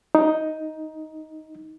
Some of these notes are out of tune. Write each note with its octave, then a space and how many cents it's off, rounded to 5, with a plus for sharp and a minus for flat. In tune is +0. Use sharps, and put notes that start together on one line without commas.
D#4 +10